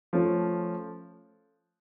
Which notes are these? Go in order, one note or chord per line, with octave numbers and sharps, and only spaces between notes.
F3 A3 C#4